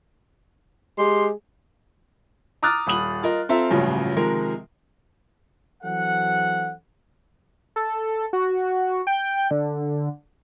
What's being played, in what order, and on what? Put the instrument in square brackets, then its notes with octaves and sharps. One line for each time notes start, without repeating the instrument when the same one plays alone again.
[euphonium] G#3 [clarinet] G4 [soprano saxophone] C6
[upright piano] A#5 D6 D#6 F6 F#6 A6
D#1 B5 D#6 F#7
F4 A#4 D#5
C4 F4 A4 E5 A#5
A1 G2 A#2 C#3 F3 F#3
C3 D#3 F3 G#3 A#4
[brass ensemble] E3 F#3 C4 A4 F#5
[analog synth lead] A4
F#4
G5
D3